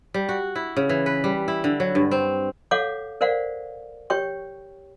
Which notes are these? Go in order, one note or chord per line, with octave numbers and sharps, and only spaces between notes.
G3
F#4
E4
C#3
E3
B4
G3
E4
D3
F#3
G2
C4
A4 C#5 F5 F#5 D6
A#4 C5 D5 F5 F#5
G4 C#5 G5 C#6